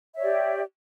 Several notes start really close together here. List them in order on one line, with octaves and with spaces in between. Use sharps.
E5 C#5 D5 G4